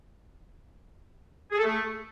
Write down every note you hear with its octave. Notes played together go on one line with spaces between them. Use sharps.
G#4
A4
A3